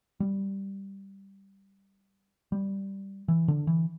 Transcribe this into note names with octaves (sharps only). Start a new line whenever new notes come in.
G3
G3
E3
D3
E3